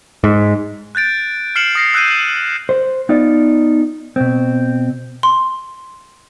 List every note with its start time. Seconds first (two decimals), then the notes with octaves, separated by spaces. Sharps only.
0.24 G#2
0.95 F#6 G6 A6 D7
1.56 F6 C7 C#7 E7 F#7
1.75 D#6 A#6 C7
1.94 E6 F#6 G6 C7 D#7
2.08 E7
2.69 C5
3.09 B3 D#4 F4 D5
4.16 B2 C4
5.23 C6